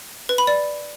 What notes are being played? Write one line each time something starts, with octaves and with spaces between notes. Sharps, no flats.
B4
B5
D5